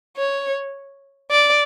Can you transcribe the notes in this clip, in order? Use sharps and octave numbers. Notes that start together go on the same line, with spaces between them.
C#5
D5